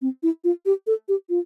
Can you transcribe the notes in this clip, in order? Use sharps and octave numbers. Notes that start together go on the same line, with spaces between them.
C4
E4
F4
G4
A4
G4
F4